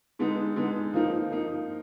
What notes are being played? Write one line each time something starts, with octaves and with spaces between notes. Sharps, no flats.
D3 G#3 B3 D#4
D3 G#3 B3 D#4
F3 A#3 D#4
F3 A#3 D#4